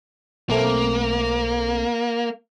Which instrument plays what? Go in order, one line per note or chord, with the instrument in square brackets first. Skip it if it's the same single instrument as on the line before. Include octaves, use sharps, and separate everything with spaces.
[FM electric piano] B1 A3 C4 [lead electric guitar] A#3